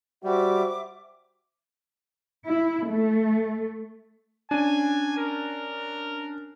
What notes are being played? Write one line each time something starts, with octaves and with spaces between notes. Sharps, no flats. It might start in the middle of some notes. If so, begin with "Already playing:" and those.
G3 F#4 C5 E5 D6
E4
A3
C#4 D4 G#5
A#4